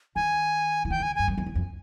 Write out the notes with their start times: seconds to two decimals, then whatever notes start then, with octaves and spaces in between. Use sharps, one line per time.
0.16 D#3 G#5
0.85 E3
0.90 D#3 G5
1.00 D3 G#5
1.16 G2 G#5
1.28 F#2
1.38 F2
1.46 E2
1.55 F2